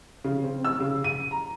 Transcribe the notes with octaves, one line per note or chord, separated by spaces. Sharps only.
C#3
C4
E6
C#3
D#7
A#5